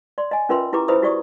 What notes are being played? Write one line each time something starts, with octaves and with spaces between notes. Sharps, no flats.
D5 C6
D#5 G#5
C#4 F4 A#4 B4 E5 C6
E4 G4 B4 A#5 D6
E4 B4 C5 E5 B5 D#6
E4 F#4 G4 D5 C#6 D#6